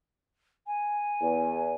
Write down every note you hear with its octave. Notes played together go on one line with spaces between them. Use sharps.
G#5
E2